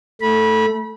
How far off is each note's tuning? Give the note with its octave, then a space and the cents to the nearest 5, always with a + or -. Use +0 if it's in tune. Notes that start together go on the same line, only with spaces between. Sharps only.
A3 +0 B5 -25